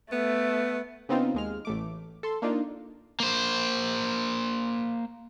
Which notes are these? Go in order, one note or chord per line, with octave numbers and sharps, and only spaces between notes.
A3 B3
C#3 B3 C4 D#4 F4
D#2 G#3 F6
A1 A3 D6
A4 C6
A#3 D4 D#4 F4
A#3 C5